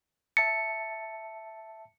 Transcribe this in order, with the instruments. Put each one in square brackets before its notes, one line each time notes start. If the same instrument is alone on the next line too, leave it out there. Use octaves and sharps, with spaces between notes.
[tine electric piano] E5 A5 A6 [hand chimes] C#7